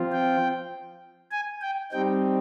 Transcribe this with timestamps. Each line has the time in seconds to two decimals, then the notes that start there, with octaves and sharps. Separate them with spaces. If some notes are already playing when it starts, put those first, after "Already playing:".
Already playing: F3 C4 F4
0.12 G5
1.32 G#5
1.62 G5
1.92 G3 C4 D#4 G5